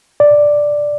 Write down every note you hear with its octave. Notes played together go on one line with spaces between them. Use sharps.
D5